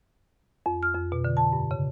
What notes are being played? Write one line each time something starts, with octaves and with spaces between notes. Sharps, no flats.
F2
F6
F2
B2
D3
A5
G2
C#3